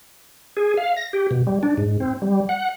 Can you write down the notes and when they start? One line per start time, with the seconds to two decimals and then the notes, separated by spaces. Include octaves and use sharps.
0.57 G#4
0.77 F5
0.96 A#6
1.13 G4
1.31 B2
1.47 G3
1.63 D4
1.78 G#2
2.00 C4
2.22 G3
2.49 F#5